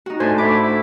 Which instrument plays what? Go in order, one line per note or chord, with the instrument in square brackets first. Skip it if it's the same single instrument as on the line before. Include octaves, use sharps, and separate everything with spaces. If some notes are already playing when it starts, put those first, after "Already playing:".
[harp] D#4 F#4
[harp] A2 [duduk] D4 [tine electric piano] C5 A5 [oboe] G#5
[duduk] A3 [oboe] B5 [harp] D6
[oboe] E4